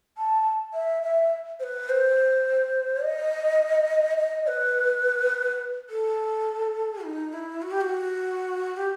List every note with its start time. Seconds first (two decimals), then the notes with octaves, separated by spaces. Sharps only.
0.18 A5
0.74 E5
1.03 E5
1.60 C5
1.64 B4
1.89 C5
3.03 D#5
4.18 D#5
4.47 B4
5.90 A4
7.04 D#4
7.33 E4
7.62 F#4
7.71 G4
7.81 F#4
8.77 G4